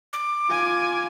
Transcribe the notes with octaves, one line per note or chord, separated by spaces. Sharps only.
D6
F4 G#5